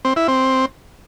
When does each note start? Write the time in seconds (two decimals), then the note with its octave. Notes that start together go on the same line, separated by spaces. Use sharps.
0.05 C4
0.16 E4
0.28 C4